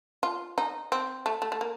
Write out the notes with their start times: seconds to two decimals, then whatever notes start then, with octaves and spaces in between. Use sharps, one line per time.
0.23 F4
0.58 D#4
0.92 C4
1.26 A3
1.42 A3
1.52 A3
1.61 A#3